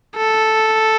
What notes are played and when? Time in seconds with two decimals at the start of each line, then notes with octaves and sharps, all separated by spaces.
0.16 A4